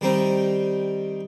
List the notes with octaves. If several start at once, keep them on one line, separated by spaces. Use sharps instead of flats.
D#3 G3 C4 D#4